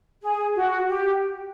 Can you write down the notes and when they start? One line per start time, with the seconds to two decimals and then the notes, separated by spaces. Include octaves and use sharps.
0.22 G#4
0.56 F#4
0.88 G4